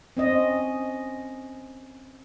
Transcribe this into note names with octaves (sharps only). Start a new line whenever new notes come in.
C4 C#4 D#5